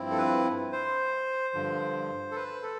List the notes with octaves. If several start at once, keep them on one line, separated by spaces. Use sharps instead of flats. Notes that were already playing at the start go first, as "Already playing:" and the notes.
Already playing: G2 F3 C4 E4
A4
B4
C5
G2 D3 F3
A4
B4
A4